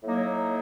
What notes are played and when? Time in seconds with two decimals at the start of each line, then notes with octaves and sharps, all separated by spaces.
0.03 A2 F#3 A#3 D#4